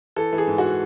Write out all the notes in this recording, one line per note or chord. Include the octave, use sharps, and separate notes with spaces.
E3 A4
E3
G#4
G#2
F#4